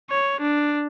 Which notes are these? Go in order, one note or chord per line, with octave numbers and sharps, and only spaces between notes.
C#5
D4